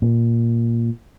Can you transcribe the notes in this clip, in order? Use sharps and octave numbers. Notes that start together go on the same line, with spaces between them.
A#2